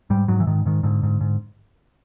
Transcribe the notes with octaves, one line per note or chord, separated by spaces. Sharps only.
G#2 G3
G#2 F#3
E3
G#2 D#3
G#2 D#3
G#2 D3
G#2
G#2